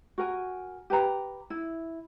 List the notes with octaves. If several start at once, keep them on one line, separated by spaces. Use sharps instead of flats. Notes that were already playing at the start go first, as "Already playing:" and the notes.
F#4 A#4 G#5
G4 B4 A#5
E4